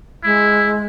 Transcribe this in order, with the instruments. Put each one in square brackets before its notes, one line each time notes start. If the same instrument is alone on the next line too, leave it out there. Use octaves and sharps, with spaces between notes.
[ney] G#3 [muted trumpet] E4